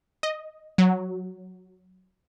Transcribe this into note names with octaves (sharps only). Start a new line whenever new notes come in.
D#5
F#3